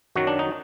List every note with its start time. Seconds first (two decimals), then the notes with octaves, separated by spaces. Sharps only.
0.16 F#2 D#3 F#3 F#4
0.27 D4
0.39 D#4